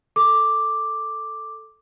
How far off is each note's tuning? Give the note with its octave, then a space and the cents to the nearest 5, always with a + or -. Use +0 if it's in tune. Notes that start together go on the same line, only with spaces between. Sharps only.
A4 +0 D6 +0